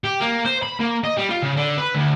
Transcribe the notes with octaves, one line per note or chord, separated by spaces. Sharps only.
G4
A#3
C5
B5
A#3
D#5
G3
F4
C#3
D3
B4
D2